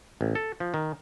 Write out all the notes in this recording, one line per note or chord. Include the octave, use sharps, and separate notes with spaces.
A1
A4
F3
D#3